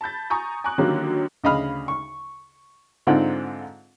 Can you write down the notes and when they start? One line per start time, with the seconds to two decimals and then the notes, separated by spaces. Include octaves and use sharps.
0.01 A5 B5 G6 A6
0.30 G#5 A#5 C#6 D#6 G6
0.64 G#5 A#5 C#6 D6 F#6
0.78 D3 D#3 F#3 G3 A#3 C#4
1.43 D2 C#3 D#5 F5 B5 F6
1.88 C#6
3.07 G#2 D3 C4 D#4 F4 F#5